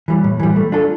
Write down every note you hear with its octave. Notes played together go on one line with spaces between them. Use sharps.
E3 G3
A2
E3 G3
A3
D4 F4 A4